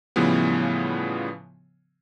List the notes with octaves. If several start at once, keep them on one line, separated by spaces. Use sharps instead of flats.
A2 C#3 E3 F3 G3 B3